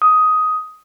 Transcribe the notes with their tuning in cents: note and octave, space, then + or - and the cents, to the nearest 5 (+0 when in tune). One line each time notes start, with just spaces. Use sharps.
D#6 +10